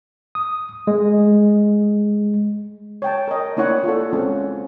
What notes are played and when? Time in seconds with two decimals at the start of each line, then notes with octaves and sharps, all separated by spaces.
0.35 D#6
0.87 G#3
3.02 C#5 G5 A5
3.28 A#4 D#5
3.57 A#3 D4 E4 C#5 F#5
3.84 F4 A4
4.13 G#3 C4 C#4